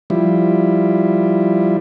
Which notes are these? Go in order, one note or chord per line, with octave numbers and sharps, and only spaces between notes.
F3 G3 E4